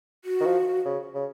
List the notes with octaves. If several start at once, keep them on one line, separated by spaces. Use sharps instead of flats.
F#4
D#3
F3
C#3
C#3